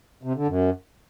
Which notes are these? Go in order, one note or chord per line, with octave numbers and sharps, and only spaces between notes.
C3
D3
F#2